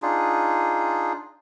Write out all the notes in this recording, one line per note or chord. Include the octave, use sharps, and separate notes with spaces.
D4 D#4 F4 G#4